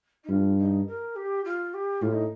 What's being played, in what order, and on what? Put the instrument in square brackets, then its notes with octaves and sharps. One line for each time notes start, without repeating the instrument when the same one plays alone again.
[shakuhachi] D#4
[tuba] G2 [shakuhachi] F4
[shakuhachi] D#4
A#4
G4
F4
G4
[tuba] A2 [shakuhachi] F4
[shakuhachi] D#4